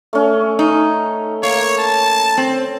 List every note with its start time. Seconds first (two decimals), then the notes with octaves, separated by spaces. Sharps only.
0.13 A3 C#4
0.59 D#4
1.43 A#3 C#5
1.78 A5
2.38 C4